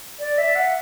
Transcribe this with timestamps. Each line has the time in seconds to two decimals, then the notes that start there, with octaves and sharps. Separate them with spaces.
0.19 D5
0.38 E5
0.55 F#5